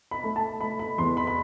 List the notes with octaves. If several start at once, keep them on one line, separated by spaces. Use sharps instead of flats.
B5
A3
A5
A3 B5
B5
E2 C6
B5
B5